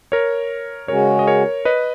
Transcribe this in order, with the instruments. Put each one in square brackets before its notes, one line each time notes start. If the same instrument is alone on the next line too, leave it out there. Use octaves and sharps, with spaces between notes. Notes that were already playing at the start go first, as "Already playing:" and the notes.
[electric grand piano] A#4 C#5
[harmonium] C#3 G#3 C#4 F#4 [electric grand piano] A#4 C#5
[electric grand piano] D#5
A#4 C#5
B4 D#5